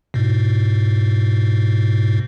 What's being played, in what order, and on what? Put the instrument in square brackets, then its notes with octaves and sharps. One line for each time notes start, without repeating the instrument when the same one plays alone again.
[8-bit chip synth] G#2 B2